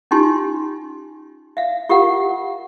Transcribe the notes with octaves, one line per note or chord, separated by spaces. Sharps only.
C#4 D#4 F4 G4 G#5 C6
E5 F5
F4 G4 A#4 F5 F#5